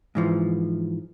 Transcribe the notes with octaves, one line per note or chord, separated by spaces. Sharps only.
G#2 E3 F3